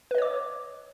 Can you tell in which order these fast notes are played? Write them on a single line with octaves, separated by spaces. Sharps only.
B4 D#5 C#5 D6